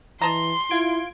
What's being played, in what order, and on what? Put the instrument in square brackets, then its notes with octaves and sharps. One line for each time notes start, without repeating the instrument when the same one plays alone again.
[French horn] E3 [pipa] D#5 A5 A#5 [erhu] C6
[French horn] E4 [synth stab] F4 G#6 D7